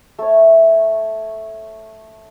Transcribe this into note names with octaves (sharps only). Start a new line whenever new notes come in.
A3 C#5